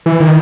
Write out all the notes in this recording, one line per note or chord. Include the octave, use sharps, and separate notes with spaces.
E3
D#3